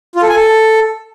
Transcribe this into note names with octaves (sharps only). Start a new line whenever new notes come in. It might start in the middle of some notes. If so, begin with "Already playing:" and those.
F4
A4
G#5
A4